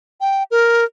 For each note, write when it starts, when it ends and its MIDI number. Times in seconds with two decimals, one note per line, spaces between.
0.21 0.43 79
0.51 0.85 70